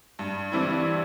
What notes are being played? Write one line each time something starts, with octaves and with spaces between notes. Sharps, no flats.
G2
E3 G3 C4 E4